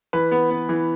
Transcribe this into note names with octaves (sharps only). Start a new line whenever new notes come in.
E3 B4
B3
B3
E3